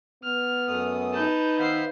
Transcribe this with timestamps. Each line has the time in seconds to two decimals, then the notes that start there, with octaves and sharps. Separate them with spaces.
0.24 B3 F6
0.68 F#2 A3 D#6
1.13 D#4 B4 A5 G6
1.59 D#3 B3 C5 E5 F5 C7